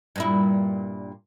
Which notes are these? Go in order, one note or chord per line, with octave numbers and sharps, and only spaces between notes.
G2 A#2 E4